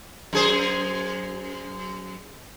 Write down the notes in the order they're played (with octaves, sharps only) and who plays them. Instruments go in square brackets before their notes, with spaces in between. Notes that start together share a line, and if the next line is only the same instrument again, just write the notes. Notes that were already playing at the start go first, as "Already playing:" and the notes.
[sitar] F#2 G#4 C5